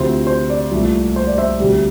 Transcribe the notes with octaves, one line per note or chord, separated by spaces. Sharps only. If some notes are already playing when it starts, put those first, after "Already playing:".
Already playing: D2 C3 F3 C4 C5
C5
D5
C2 A#2 A3
C5
D5
C5 E5
D2 C3 G3